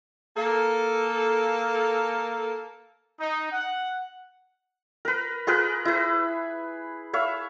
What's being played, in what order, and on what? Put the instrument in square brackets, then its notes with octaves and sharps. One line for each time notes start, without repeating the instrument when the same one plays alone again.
[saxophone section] A#3 A4
[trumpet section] D#4
F#5
[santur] A#4 B4
F4 G#4 A#4 B4
E4 B4
C#5 E5 F5